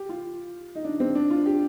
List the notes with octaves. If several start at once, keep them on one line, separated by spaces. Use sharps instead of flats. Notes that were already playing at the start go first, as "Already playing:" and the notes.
Already playing: G4
F4
D#4
D4
C4
D4
F4
G4